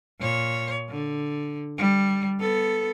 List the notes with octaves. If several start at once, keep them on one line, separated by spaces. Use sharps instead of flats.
A#2 C#5
D3
G3
B3 A4